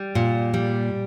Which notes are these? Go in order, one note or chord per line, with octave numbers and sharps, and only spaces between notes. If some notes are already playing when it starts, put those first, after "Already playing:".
Already playing: G3
A#2
G3